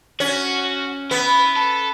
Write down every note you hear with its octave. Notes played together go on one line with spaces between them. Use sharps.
C#4 F#4
B3 E4
A4